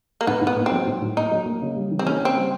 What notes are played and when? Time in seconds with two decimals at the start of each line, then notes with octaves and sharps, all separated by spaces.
0.21 A#3
0.27 A2 B3
0.41 A2
0.47 B3
0.57 A#3
0.66 C4
0.72 F#3
0.87 A2
1.01 A2
1.17 A#3 D#4
1.31 F#3
1.46 A#3
1.62 C#3
1.76 G3
1.91 E3
1.99 C4
2.06 A#3 C#4
2.21 C#3 C4
2.36 G3